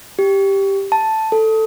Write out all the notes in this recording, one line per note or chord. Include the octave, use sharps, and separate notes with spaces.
G4
A5
A4